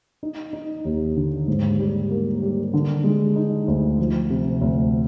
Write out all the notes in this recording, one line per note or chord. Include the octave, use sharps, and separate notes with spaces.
D#4
D#4
D#2
D3
G#2
G3
A#3
G3
D3
G#3
D#4
D2
F3
C3
D2